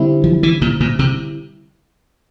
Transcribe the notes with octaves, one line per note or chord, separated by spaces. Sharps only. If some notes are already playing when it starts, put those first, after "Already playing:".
Already playing: D3 G3 C4 E4
F3
E3
A#2
A#2
C3